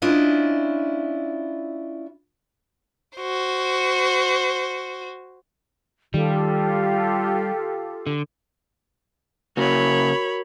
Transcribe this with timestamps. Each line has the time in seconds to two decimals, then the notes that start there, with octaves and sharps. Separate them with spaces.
0.02 C#4 D4 E4 F4 D#5
3.18 F#4 C5
6.14 D#3 G3 F4 G4 A4
8.07 D3
9.57 C#3 A#3 F#4 A#4 C#5 B5